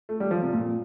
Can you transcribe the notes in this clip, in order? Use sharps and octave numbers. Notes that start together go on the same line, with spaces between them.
A3
G3
F3
C3
A#2